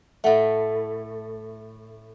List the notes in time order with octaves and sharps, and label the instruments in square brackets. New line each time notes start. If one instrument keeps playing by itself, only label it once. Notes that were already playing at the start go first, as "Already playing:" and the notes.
[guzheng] A2 A3 [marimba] E5 F#5